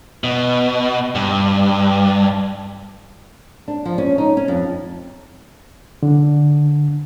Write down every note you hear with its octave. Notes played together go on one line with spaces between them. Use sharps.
B2
G2
D4
F3
C#4
D#4
C#4
F2
D3